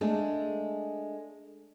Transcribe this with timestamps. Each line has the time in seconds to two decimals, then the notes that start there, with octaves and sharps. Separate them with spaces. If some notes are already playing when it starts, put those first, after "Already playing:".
0.01 G#3 A3 D4